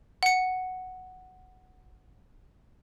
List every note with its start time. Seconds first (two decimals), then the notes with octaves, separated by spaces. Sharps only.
0.23 F#5 C#7